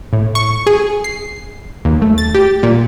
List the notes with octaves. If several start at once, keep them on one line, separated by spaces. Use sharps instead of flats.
A2
C#6
G#4
C7
D#2
A3
A6
G4
A#2